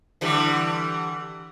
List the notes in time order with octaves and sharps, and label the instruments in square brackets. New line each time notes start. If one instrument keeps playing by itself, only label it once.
[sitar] D3 E3 G3